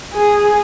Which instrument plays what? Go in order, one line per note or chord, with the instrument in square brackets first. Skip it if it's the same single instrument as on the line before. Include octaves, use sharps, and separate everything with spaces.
[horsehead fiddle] G#4